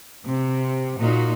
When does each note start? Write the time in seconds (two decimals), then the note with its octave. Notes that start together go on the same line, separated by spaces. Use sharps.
0.24 C3
0.98 A#2 D#4 F#4